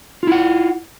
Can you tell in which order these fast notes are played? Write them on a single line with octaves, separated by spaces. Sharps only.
F4 E4 F#5